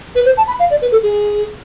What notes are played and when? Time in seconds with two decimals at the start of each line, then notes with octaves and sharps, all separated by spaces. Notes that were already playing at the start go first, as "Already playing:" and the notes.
0.15 B4
0.25 C5
0.37 A5
0.48 B5
0.60 F5
0.71 D5
0.82 B4
0.92 A4
1.03 G#4